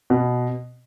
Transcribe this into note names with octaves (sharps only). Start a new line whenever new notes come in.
B2